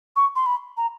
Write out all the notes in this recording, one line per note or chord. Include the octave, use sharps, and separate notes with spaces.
C#6
C6
B5
A#5